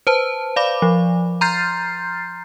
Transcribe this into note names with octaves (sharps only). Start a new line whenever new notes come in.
B4 C5 A5
D5 F5 B5 D6
F3
A#5 C6 F6 G6 A6 C7